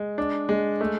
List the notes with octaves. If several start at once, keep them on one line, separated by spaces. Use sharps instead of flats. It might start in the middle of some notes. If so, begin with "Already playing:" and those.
Already playing: G#3
D4
G#3
A3